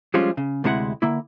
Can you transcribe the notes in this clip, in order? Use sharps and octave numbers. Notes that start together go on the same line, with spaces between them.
F3 G3 G#3 C#4 F4
C#3
D2 C3 G#3 E4 G#4 F#5
D3 A#3 E4